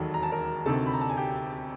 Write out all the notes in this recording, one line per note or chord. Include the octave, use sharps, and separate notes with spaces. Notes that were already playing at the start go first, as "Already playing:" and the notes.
Already playing: E1 D#2 D#3 F#3 A4 A5
A#5
A5
A#4 A#5
D2 C3 D#3 A4 A5
B5
A#5
A5
G#5
G4 G5